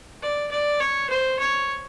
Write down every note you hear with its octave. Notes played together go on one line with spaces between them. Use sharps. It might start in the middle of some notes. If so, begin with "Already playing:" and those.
D5
D5
C#5
C5
C#5